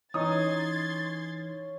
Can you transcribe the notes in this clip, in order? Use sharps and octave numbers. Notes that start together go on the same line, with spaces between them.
E3 C#4 D#4 C6 D#6 G#6 A6